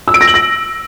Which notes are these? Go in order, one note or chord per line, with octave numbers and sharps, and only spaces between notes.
E6
D7
A#6
F#7
A#6